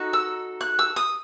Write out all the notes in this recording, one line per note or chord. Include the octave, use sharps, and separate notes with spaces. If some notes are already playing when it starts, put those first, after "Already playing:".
Already playing: D#4 F#4 A4
E6
F#6
E6
D#6